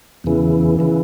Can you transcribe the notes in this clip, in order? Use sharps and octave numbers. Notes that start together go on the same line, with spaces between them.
E2 C#3 E3
C#3 E3